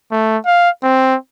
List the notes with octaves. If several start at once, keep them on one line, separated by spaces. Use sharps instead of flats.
A3
F5
C4